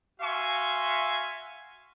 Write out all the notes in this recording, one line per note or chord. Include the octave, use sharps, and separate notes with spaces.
F#4 E5 F5 G#5 C6 C#6